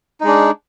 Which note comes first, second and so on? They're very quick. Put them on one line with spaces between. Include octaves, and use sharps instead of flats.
D#4 G#3 D4